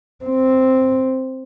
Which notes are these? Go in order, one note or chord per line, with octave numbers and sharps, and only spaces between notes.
C4